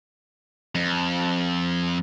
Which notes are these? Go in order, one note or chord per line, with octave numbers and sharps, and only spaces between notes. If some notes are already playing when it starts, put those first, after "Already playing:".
F2